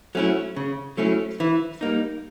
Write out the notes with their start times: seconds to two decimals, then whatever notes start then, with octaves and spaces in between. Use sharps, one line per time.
0.15 F#3 A3 C#4 E4
0.56 C#3
0.97 F#3 A3 C#4 E4
1.40 E3
1.81 G3 A#3 D#4